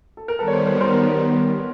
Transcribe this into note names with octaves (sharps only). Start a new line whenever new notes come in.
A4
A#4
D#3 G3 B3 A4 B4
C#5
C5 D5
A#4 C5
A#4 C5